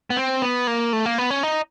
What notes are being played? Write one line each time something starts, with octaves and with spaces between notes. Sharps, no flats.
B3
C4
B3
A#3
A3
A#3
B3
C#4
D#4